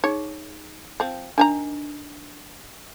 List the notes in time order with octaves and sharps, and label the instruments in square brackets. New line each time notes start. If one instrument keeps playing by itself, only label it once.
[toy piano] D#4 G#4 [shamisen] C#5
[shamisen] F3 C4
[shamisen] D#3 G#5 A#5 [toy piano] D4